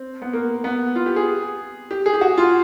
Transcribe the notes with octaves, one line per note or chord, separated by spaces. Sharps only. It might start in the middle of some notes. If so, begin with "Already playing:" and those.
Already playing: C4
B3
A#3
B3
F4
G4
G#4
G4
G#4
G4
F#4
F4